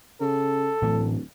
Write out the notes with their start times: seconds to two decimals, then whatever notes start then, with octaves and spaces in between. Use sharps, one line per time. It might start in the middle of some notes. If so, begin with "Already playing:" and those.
0.21 C#3 A4
0.82 D1 A2 E3 D4